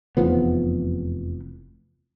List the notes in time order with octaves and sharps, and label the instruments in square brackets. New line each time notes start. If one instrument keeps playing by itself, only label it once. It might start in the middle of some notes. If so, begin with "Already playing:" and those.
[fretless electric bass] F1 E2 F3 B3